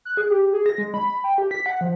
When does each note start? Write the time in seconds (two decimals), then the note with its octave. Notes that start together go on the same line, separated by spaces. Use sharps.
0.05 F#6
0.17 G#4
0.30 G4
0.53 G#4
0.66 A#6
0.78 G#3
0.94 B5
1.24 G5
1.38 G4
1.51 B6
1.66 F#5
1.81 F3